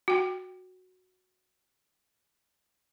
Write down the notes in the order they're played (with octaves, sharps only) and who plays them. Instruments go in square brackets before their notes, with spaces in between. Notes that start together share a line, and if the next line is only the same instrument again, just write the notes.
[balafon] F#4 G5